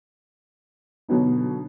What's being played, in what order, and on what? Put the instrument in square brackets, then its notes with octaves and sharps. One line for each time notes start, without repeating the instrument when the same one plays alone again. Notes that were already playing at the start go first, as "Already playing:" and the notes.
[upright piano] B2 D3 F#3 B3 D#4